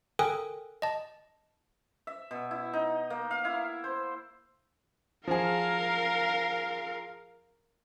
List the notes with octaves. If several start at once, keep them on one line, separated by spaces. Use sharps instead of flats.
A4 A#4 G5 G#5 D#6 F#6
D#5 A5
E5
B2
E4
D#4
A#3
F5
E4
C5
F3 G#4 A#4 F5